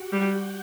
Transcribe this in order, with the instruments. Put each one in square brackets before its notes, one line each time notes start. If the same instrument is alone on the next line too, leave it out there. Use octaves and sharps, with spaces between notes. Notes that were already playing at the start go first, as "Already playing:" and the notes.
Already playing: [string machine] F#4 G4 F#5 G5
[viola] G3